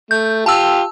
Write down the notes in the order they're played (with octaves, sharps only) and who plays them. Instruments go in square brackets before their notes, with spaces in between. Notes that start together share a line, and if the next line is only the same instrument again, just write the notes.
[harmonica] A3 [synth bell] G6
[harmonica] F4 G4 [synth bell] A5 E6